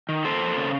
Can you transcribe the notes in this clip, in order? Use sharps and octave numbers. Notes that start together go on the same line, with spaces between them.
D#3
A#3 A4 C5
F3
C#3